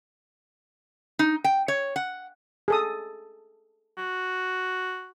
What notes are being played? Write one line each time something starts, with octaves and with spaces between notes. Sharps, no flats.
D#4
G5
C#5
F#5
G#4 A4 D#6
F#4